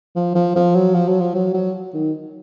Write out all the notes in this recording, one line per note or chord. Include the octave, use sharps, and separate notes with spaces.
F3
F3
F3
F#3
F3
F#3
F3
F#3
F#3
D#3